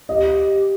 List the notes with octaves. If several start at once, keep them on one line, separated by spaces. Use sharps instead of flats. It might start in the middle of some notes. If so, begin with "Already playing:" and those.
G4 D#5